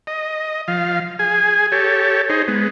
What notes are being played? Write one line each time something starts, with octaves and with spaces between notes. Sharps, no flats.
D#5
F3 F5
G#4 G#5
G4 A4 C#5
D#4 G#4 C5
G#3 B3